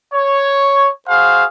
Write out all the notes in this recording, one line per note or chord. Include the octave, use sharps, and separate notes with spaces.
C#5
F#4 G#4 C5 F5